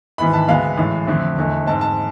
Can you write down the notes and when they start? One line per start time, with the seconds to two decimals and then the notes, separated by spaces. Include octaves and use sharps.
0.18 G#1 G#2 E3 B3 B5
0.33 A5
0.48 D2 C3 G#3 B3 F5
0.78 A1 A2 G#3
1.07 F2 D3 A3 C4
1.37 E1 E2 D3 A3
1.66 G#2 G#3 C4 A5
1.81 A5